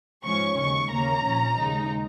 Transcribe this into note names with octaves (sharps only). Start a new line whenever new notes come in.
G#2 F3 G#3 C#4 C#6
D#2 C#3 G#3 C#6
D#2 C#3 A#3 C#4 A#5
A#1 A#2 F3 C#4
D#2 C#3 G#3 D#4